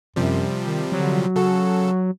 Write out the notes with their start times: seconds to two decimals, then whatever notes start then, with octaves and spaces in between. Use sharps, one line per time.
0.16 F#2 C3 F3 G3
0.63 D#3
0.92 D3 F#3
1.36 C#3 F#4 A4